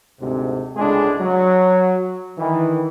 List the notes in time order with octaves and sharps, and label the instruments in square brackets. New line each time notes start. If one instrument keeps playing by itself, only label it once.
[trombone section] D2 G#2 C3
C#2 A2 G#3 D4 G#4
F#3
D#3 E3